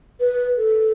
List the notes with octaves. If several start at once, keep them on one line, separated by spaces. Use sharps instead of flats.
B4
A4